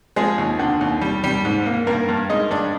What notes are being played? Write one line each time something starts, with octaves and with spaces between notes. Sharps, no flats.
F3 G#3 G#4
D#2
D3
D#2
G3
G3
G#2
A#3
G2 A#3 A#4
G2
G#3 D#4 D#5
G2 D4 D5